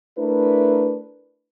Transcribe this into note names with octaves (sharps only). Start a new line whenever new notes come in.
A3 D4 E4 A#4 B4